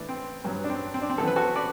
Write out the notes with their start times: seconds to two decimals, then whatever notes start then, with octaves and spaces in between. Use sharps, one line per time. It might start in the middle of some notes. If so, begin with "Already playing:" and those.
Already playing: A2 E3 A3 B3 D4
0.09 C4
0.44 G2 F#3 B3
0.64 D4
0.70 C4
0.94 C4
1.02 D4
1.10 C4
1.18 F#2 E3 B3 A4
1.28 B4
1.36 F#4 A4
1.56 B4 D5